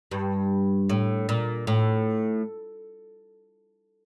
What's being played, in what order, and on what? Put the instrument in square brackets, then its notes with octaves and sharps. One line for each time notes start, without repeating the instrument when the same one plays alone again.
[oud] G2
A2
A#2
A2